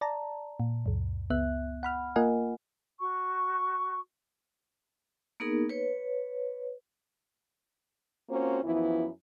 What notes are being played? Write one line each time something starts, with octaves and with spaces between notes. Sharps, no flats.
D5 A5 A#5
A#2
C#2 F#2
C#2 B3 E5 F#6
F#5 B5 F6
A#3 F4 A#4 D#5 F#5 G#5
F#4 C#6
A#3 B3 D#4 G#4 A#4
B4 C#5
A#3 C4 C#4 F4 F#4 C5
F#2 E3 F3 B3 E4